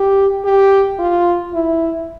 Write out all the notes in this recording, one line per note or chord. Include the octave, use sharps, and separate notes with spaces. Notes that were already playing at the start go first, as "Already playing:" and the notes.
Already playing: G4
G4
F4
E4